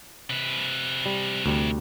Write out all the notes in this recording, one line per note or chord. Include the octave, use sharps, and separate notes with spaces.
C3 B4
G3
D2 G3